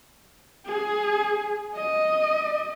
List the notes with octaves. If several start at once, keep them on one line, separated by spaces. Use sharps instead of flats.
G#4
D#5